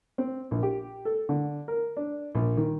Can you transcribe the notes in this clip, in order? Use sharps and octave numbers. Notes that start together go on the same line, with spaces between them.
C4
A#1
G4
A4
D3
A#4
D4
A#1
D#3